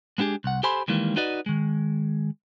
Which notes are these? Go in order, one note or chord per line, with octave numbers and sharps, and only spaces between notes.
G#3 B3 D4 G4 G#4
C2 F#5
G4 A4 C5 G#5 B5 C6
D#3 E3 G3 G#3 A#3
D#4 F#4 B4 D5 D#5
D#3 G#3